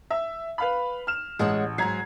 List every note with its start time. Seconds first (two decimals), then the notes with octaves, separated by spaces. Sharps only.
0.11 E5
0.58 B4 F5 B5
1.07 F6 E7
1.39 A1 G#3 C#5 F#5
1.78 G#2 F#3 A#5 G#6 C7